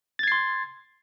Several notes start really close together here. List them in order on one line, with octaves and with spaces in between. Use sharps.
A6 G#6 C7 C6